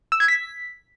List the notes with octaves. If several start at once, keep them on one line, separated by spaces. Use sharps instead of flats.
E6
G#6
B6